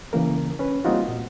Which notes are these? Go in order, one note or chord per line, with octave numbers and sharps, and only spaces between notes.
C#3 E3 A#3 A#4
C#4 B4
G3 A#3 C4 D#4 F4 F#4
A#2